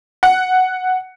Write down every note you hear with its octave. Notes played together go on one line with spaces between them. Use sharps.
F#5